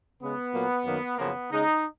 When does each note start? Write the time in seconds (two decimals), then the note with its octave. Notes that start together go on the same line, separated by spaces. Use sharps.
0.21 C#3 G#3 B3
0.53 A#2 F#3 A#3
0.85 F#2 D#3 F#3 A#3
1.18 F#2 C#3 F3 A#3 B3
1.51 C#3 G#3 D#4